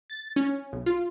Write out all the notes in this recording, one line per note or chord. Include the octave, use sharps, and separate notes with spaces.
A6
C#4
B1
F4